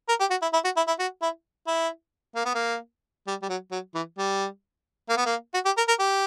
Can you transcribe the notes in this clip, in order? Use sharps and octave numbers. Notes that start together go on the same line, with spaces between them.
A#4
G4
F#4
E4
E4
F#4
E4
E4
F#4
E4
E4
A#3
B3
A#3
G3
G3
F#3
F#3
E3
G3
A#3
B3
A#3
F#4
G4
A#4
A#4
G4